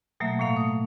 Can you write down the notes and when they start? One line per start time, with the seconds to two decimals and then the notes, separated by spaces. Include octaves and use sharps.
0.20 B2 F#3 A3 A#3 E5
0.39 A2 A3 A#3 F5
0.56 D#6